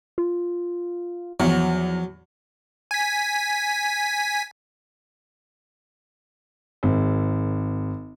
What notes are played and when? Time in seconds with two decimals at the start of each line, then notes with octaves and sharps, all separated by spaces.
0.18 F4
1.40 E2 F3 F#3
2.91 G#5 B6
6.83 G#1